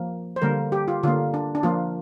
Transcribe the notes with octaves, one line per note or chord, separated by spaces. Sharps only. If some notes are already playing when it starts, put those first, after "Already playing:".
Already playing: F3 A#3
C5
D3 G3 A#3 A#4
G4
F4
D3 A#3 F4
D4
D4
F3 A#3 F4